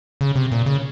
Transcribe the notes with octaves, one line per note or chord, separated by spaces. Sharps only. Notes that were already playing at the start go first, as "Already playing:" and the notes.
C#3
C3
A#2
C#3